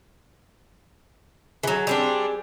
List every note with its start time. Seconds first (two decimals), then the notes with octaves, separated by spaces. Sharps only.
1.63 E3 F#3 G#4
1.87 G3 C4 D4